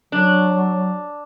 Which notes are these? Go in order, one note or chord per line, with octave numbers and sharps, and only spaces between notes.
F#3 D4